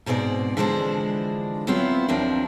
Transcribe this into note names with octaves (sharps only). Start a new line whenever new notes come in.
G#2 B2 G#3 C4 D5
D3 E3 F3 G#3 D4 C5
F#3 B3 C4 E4 F4
D#2 F3 C4 D4 A#4